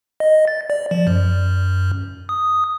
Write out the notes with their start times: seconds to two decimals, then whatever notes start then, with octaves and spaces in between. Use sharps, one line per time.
0.20 D#5
0.48 A6
0.70 D5
0.91 F3
1.07 F#2
2.29 D#6